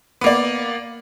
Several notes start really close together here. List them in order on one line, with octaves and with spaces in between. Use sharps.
B3 A#3 D5